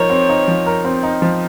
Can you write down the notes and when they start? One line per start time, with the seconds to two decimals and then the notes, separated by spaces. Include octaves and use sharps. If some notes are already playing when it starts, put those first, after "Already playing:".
Already playing: F3 D#4 A#4 C#5
0.10 C4
0.29 D#4
0.48 F3
0.66 A#4
0.85 C4
1.03 D#4
1.22 F3